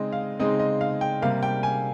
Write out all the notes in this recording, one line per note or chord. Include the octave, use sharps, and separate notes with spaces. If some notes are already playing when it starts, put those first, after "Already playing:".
Already playing: C#3 G#3 C4 D#4 D#5
F5
C#3 G#3 C4 D#4 D#5
D#5
F5
G5
C3 G3 A#3 F5
G5
G#5